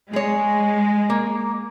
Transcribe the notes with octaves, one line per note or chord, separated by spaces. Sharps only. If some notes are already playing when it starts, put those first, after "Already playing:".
G#3 G#4 C#5
A#3